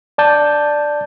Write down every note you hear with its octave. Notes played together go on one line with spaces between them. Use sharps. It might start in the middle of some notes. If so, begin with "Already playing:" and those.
D5 A5 G6